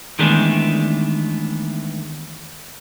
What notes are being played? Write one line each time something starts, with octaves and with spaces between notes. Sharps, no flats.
D#3 E3 G#3 A3 B3 D4